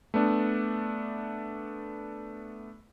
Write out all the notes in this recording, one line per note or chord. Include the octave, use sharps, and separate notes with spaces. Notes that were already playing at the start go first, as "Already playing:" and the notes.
A3 B3 D4